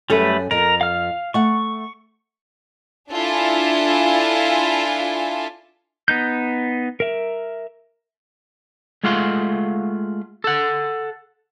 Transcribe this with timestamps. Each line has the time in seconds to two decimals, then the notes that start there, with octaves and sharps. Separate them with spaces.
0.10 F#2 G3 A3 C#4 A4 B4
0.51 F2 F3 A#4
0.81 F5 F6
1.34 A3 F#5 C#6
3.11 D4 E4 F4 A4 G#5
6.08 B3 D#4 G6
7.00 A#4 E5
9.03 G#3 A3 F4 F5 F#5 C6
10.44 A4 F#5